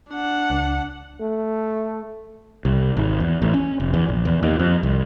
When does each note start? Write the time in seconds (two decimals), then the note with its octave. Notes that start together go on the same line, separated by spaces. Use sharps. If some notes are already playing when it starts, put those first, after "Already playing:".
0.10 D4 F#5
0.50 C#2
1.20 A3
2.65 C2
2.97 G#1
3.20 E2
3.42 A1
3.54 C#4
3.80 F1
3.94 E2
4.08 A#1
4.25 E2
4.43 D#2
4.59 F2
4.83 C2